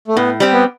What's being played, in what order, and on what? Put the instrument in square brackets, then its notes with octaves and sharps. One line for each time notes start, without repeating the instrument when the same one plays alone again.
[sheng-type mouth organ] A3
[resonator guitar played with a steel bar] A2 [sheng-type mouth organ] B3
[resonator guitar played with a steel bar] G3 C4 G4
[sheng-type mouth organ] B3